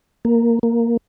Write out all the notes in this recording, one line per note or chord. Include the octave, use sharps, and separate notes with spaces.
A#3
A#3